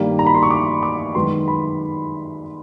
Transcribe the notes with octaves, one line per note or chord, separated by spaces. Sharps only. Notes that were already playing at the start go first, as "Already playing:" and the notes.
Already playing: G2 D#3 G3 A#3
A#5
B5
C6
C#6
D6
D6
F#2 D#3 G#3 B3 C6
B5